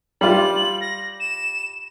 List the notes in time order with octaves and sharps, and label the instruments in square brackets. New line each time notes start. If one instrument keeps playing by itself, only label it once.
[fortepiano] G3 F4 [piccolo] F#7
[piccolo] A#6
E7